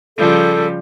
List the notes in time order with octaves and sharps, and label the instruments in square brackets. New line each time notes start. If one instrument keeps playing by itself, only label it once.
[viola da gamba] C#3 F3 G3 [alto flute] A4